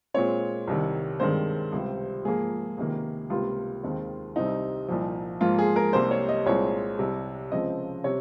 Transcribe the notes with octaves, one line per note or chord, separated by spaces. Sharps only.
A#2 G#3 C4 C#5
C2 C3 D#3
G2 D#3 G#3 C4 C5
C#2 C3 G3
G#2 F3 A#3 G#4
C#2 C3 D#3 A#3
C#2 C3 G3 A#3 F4
D#2 D#3 G#3 C4
C2 C3 G3 C4 D#4
C2 A#2 F3
G#2 F3 A#3 F4
G#4
A#4
C2 C3 G3 A#3 C5
C#5
D#5
C2 A#2 G#3 C4 C#5
C2 C3 G3
C#2 C#3 F3 C4 D#5
C3 G3 C4 C#5